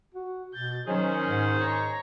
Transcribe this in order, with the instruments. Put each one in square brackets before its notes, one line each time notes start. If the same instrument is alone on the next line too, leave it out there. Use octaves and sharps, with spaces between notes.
[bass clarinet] F#4
[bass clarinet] B2 [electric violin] G6 A6
[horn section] D#3 G#4 C5 [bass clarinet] F#3 [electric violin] C#4
[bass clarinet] G#2
[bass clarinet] G#2 [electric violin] C#5 A#5